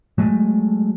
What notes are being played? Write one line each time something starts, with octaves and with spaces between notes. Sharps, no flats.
F#3 G#3 A3